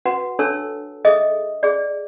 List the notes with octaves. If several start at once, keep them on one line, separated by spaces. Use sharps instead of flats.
F#4 B4 F#5
D4 A4 C#5 A5 E6
G#4 A4 D#5 E5 D#6
G#4 D5